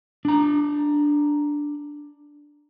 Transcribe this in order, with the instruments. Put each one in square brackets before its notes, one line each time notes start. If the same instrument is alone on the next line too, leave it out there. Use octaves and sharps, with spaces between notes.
[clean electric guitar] D4 A#5